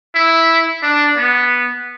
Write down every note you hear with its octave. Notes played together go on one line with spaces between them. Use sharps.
E4
D4
B3